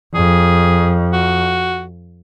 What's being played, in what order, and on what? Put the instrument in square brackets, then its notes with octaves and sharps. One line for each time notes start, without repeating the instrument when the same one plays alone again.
[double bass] F2 [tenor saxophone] G#4
[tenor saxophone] F#4